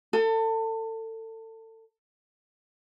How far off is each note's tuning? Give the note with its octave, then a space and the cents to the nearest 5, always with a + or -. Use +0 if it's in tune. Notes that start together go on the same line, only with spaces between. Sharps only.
A4 +30